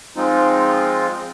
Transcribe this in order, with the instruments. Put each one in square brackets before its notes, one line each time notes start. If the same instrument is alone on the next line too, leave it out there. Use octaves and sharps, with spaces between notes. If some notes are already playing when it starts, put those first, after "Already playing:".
[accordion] F3 G#3 C4 D#4 F4